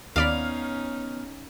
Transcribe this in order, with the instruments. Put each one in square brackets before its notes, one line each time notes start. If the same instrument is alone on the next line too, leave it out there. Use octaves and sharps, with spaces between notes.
[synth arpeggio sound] D#2 D5 B5 [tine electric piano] B3 F6 [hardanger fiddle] C#4 D#4 [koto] F5